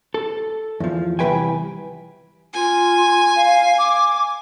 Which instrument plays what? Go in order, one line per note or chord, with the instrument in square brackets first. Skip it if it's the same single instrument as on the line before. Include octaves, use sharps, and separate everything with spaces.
[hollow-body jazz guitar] A4
E2 F3
C2 F2 E3 B4 G5 G#5
[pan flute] F4 [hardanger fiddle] G#5
[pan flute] F5
D6